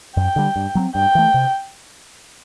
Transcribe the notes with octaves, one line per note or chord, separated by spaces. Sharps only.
F#2 G5
D3 G3
G2
F#3 A3 C4
G2 G5
E3 A3
C3